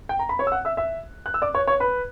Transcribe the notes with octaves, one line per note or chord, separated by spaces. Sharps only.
G5
A#5
B5
C#5 C#6
E6
F#5 F#6
E5 E6
E5 E6
F#6
E6
D5 D6
C#5 C#6
C#5 C#6
B4 B5